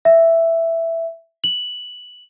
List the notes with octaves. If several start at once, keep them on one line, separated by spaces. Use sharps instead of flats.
E5
F#7